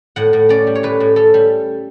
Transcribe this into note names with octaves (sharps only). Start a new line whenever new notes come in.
A2 F#5
A2
C#4 D5
G3
C#5
A2 B4
A2
C#4 A4
G3